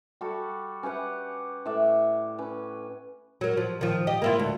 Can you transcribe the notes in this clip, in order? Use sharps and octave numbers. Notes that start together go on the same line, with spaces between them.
G3 F#4 A4
C#4 G4 B4 F#5
A2 D5 E5
C#4 B4
F#3 A#4
F3
D#3 F3
G4 D#5
A#3 E4 F4
D2